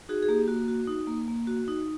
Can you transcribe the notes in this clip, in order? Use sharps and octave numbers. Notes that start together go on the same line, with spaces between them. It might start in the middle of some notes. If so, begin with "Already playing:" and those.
D#4 F#4 G#4
G#4
A#3 G4
A#3 F#4
F#4
D#4
A#3
A#3
F#4
D#4